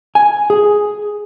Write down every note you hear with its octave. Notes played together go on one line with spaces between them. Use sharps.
G#5
G#4